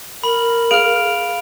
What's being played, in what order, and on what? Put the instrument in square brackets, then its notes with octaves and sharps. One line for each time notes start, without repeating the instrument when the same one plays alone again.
[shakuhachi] A#4 [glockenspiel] B5 F#7
[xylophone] G#4 F6 [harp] F5 [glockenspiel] D7 F7